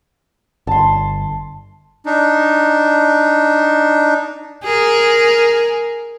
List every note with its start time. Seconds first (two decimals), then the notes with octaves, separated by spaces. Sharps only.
0.67 G1 A5 C6
2.06 D4 D#4
4.64 G#4 A#4